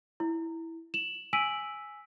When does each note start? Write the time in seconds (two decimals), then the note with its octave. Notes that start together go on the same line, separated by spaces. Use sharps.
0.20 E4
0.94 E7 F#7
1.33 G#5 E6 B6 D7 D#7 F#7